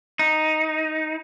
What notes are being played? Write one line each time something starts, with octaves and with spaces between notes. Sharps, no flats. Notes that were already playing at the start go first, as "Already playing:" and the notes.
D#4